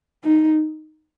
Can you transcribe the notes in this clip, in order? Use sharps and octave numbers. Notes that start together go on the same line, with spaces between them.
D#4